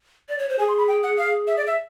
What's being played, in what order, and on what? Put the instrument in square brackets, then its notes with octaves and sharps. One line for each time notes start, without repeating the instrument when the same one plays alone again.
[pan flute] D5
C#5
C5
[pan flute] G#4 [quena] G#5
[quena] C6
B5
G5
F#5
F5
E5
D5
E5